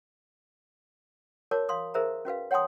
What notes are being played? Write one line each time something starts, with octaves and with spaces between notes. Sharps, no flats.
F#4 A#4 C#5 A5 D6
F5 C6 D#6
D#4 G#4 A#4 C5 E5 A#5
C#4 F#4 B4 F5
C#5 F#5 G5 A5 C6 D#6